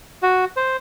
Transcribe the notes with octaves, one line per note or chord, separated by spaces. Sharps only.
F#4
C5